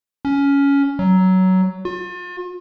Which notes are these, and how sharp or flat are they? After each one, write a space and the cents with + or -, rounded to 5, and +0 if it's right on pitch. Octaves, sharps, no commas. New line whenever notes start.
C#4 +15
F#3 +15
F4 +40